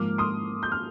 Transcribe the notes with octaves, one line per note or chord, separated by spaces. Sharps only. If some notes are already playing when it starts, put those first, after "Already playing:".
Already playing: G#2 F3 A#3 D6 F6
C6 D#6
G6
F6